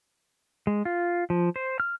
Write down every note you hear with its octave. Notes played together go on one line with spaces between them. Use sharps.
G#3
F4
F3
C5
F6